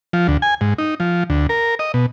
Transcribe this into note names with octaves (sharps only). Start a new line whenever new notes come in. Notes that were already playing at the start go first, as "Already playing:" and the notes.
F3
D2
G#5
G#2
D#4
F3
D2
A#4
D#5
B2